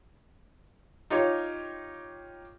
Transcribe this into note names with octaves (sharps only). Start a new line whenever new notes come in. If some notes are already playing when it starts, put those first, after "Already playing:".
D#4 F4 G4 C#5